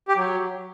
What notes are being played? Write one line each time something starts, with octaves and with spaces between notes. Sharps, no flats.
G4
F#3